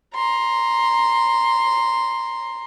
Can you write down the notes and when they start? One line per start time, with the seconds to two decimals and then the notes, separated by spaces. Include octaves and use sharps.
0.15 A#5 C6